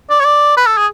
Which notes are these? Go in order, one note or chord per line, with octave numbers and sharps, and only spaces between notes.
D5
C#5
D5
B4
A4
G#4